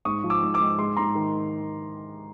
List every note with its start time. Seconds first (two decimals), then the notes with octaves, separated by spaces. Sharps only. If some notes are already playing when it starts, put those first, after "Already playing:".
0.05 G#2 C#6 D#6
0.24 F3
0.30 D6 E6
0.43 G#2
0.54 D6 E6
0.60 G#2
0.78 G#3 C6 D6
0.97 G#2 A#5 C6
1.15 D#3